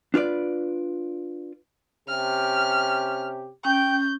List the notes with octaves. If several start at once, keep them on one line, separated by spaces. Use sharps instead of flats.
D4 F4 B4 D5
C3 C#4 G4 F6
C#4 G5 G6